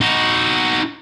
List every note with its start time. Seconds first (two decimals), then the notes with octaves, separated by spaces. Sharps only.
0.01 D#4 F#4